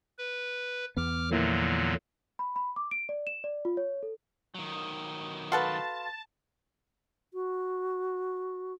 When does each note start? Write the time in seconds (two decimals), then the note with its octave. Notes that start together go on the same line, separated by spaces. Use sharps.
0.18 B4
0.97 E2 B3 D6 F6
1.31 A#2 D3 F3 F#3 A#3 E4
2.39 B5
2.56 B5
2.76 D6
2.91 D7
3.09 D5
3.27 E7
3.44 D5
3.65 F4
3.77 C#5
4.03 A4
4.55 D#3 F#3
5.52 F#4 A4 B4 F5 A5 C6
7.34 F#4